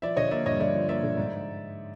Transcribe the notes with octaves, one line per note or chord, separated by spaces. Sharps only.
F3 D5 E5
D3 C#5 D#5
A#3 D5 E5
G2 C#5 D#5
D3 D5 E5
F3
A#3 D5 E5
D3
G#2